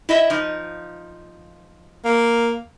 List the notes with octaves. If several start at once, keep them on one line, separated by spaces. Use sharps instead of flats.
E4 D#5 E5
F3 D#4
A#3